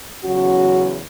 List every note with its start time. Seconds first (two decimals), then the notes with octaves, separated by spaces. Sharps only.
0.24 E2 C#3 F#3 C#4 F#4